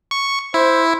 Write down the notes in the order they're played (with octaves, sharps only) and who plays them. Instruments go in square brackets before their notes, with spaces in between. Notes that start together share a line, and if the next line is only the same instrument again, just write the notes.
[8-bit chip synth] C#6
[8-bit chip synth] E4 [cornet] C5